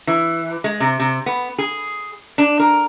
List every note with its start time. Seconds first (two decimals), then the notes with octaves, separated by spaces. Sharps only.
0.07 E3
0.64 G#3
0.80 C3
1.00 C3
1.26 B3
1.58 G#4
2.38 D4
2.59 A#4